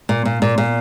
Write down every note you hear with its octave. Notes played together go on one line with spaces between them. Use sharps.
A#2
A#2
A#2
A#2